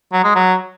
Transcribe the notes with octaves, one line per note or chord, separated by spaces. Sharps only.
F#3
G#3
F#3